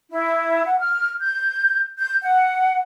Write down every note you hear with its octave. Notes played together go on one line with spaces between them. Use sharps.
E4
F#5
F6
G6
G6
F#5